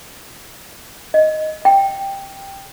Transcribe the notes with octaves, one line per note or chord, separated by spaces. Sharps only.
D#5
G5